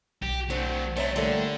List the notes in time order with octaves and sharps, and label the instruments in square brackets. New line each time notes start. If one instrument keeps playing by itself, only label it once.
[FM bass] B1 [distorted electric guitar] G4
[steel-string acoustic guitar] D3 C4 [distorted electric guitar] F#3 A3
[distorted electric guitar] F#3 A3 [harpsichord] C4 E5 A#5 [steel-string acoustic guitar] C#5 D#5
[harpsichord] A#2 A3 C6 [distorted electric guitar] D3 [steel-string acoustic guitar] G3 A#3